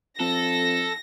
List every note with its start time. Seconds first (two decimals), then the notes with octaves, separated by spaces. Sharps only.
0.20 F2 A4 A#6